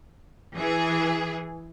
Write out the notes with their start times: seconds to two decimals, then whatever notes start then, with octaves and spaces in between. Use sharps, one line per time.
0.56 E3 G#4